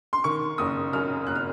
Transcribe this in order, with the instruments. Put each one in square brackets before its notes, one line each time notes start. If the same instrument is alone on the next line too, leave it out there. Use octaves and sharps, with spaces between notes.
[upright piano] C6
D#3 C#6
F#1 D#6
F#2 F6
F#1 F#6
F6